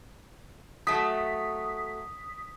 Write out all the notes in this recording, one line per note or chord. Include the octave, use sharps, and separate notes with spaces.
F#3 A3 D#6 B6